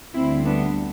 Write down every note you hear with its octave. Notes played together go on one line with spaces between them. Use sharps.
D2 D3 G3 C4 E4
B3 D4